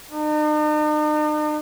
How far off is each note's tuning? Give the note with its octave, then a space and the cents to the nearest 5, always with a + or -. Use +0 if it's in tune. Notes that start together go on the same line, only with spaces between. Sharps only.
D#4 -45